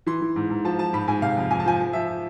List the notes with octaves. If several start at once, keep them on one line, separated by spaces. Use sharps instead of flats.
E3 C6
E3
G#2
G#2
F3 A5
F3 A5
G#2 B5
G#2 G#5
C3 F5
F2
F2 G#5
A5
F3 G#5
F3
F3 E5